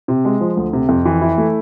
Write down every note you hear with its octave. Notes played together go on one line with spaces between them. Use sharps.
C3
G#3
F3
D2
C3
F2
E3
E4
A3